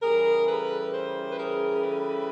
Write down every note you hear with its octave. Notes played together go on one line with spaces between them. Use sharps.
C#3 E3 G3 G#4 A#4
A4 B4
A#4 C5
B4
G#4 A#4
A4 B4